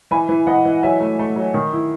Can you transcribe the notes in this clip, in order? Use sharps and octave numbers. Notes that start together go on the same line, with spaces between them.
E3 G#5 B5
E3
E3 D#5 F#5
E3
F#3 E5 G#5
A3
A3
F#3
D#3
E4